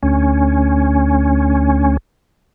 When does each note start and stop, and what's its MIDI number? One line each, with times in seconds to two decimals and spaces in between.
0.03 1.97 38
0.03 1.97 61